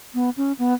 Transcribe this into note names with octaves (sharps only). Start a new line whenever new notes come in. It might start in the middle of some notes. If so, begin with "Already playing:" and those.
B3
C#4
B3